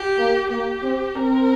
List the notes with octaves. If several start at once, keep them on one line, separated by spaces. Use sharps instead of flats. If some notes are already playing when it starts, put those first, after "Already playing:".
Already playing: G4
A#3
A#3 G4
C4
C4 A#4